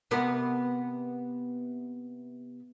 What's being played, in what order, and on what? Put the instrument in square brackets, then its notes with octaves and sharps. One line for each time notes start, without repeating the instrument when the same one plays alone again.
[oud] C3 B3 A#4